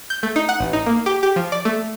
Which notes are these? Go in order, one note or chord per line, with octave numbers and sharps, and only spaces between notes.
G6
A3
D#4
F#5
A1
D#4
A#3
G4
G4
F3
D5
A3